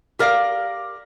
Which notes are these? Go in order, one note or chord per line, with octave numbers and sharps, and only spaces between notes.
G4 A#4 D5 F5